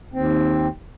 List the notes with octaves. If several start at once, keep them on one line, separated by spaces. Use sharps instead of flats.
D#2 C4